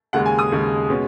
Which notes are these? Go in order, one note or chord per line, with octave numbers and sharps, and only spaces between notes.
D#2 C#3 G#3 F#5
G#5
D#6
D#2 C#3 G#3
B2 G#3 C#4